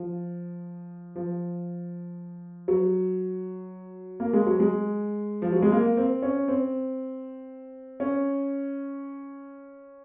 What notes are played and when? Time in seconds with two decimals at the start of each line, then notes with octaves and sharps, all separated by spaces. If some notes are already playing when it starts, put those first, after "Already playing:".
Already playing: F3
1.16 F3
2.68 F#3
4.20 A#3
4.33 G#3
4.46 F#3
4.60 G#3
5.42 F3
5.52 F#3
5.62 G#3
5.72 A#3
5.97 C4
6.22 C#4
6.48 C4
8.00 C#4